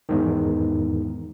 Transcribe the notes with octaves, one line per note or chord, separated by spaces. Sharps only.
E2 G#2 D#3